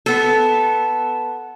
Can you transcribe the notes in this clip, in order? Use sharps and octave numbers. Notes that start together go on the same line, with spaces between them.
B3 A4